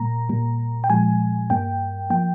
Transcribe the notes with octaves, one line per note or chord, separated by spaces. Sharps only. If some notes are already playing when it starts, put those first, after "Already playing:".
Already playing: A#2 G3 A#3 A#5
A#2 G3 A#3
G5
A#2 F3 G#3 G#5
G2 G3 A#3 G5
F3 A#3 G5